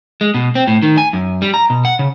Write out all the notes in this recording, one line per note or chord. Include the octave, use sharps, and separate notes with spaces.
G#3
B2
C4
A2
D#3
G#5
F#2
G3
A#5
B2
F#5
C#3